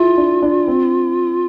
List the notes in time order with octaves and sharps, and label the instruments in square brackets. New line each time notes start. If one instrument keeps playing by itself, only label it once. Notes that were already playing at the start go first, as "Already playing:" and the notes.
Already playing: [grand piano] E4 G#4 [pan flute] F4
[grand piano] D4
D4
C4